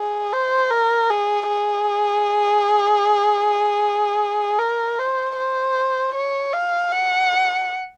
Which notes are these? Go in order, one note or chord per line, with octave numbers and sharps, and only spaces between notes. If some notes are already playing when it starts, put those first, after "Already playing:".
Already playing: G#4
C5
A#4
G#4
G#4
A#4
C5
C5
C#5
F5
F#5